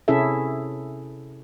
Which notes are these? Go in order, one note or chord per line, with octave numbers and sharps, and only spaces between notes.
C3 C#4 E4 G#4 A4 E5